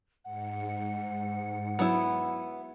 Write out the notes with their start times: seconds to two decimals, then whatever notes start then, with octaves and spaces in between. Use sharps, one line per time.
0.25 G#2 F#5 C#7
1.79 F#3 B3 E4